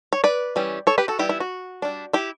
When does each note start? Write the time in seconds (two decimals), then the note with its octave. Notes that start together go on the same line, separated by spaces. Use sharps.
0.13 C#5
0.24 B4 D5
0.56 E3 G3 C#4
0.87 A4 C#5
0.98 G4 B4
1.08 F#4 A4
1.19 E3 G3 B3 E4 G4
1.29 E4
1.40 F#4
1.82 G3 D4
2.13 E4 G4